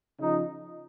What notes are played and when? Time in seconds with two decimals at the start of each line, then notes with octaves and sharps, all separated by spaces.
0.20 C#3 F3 D#4